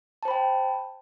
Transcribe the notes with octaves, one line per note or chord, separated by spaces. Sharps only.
C5 G5 A5 B5